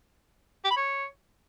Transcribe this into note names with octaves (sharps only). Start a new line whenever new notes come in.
G4
B5
C#5